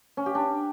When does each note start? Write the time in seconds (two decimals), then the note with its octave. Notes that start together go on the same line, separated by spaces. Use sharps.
0.17 C#4
0.26 G4
0.35 D4